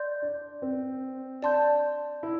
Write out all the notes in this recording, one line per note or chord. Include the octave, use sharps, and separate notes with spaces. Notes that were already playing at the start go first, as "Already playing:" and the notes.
Already playing: D5 C6 G6
D4
C4
D4 D5 A5 C6 G6
E4